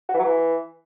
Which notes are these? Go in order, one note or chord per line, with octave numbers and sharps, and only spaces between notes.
F#4
E3
F#3
E3